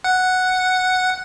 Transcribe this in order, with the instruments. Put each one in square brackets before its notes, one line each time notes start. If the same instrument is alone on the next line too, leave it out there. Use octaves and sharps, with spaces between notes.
[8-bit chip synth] F#5